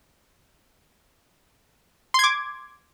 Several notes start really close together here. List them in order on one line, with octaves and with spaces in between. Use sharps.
C6 G#6 D6